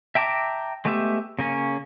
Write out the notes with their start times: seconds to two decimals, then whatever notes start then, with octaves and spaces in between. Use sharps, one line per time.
0.15 E5 G5 A5 A#5 D6
0.85 G#3 A3 B3 G4 E5
1.39 C#3 A#3 C#4